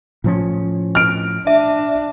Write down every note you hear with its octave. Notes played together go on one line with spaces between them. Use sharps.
A2 F3 C#4
F6 D7
D4 E5